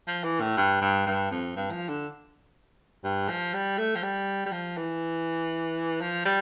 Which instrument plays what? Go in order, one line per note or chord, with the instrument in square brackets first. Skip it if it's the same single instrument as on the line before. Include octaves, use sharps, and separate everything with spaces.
[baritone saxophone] F3
E3
A2
G2
G2
G2
F2
G2
F3
D3
G2
F3
G3
A3
F3
G3
G3
F3
E3
F3
G3